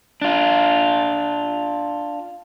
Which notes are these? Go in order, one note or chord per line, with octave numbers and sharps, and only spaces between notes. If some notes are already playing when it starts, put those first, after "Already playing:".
D4 F4